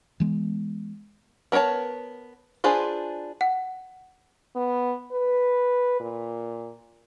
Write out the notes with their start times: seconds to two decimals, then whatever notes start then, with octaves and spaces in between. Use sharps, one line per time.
0.20 E3 G#3 B3
1.52 B3 A#4 C5 C#5 A5
2.64 D4 F4 G#4 B4 C5
3.41 F#5
4.56 B3
5.12 B4
6.00 A#2